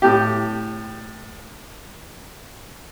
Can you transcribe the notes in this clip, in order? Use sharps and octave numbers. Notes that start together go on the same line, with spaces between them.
A2 G4